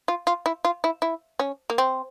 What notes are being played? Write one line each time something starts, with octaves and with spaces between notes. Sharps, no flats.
F4
F4
E4
F4
E4
E4
C#4
A#3
C4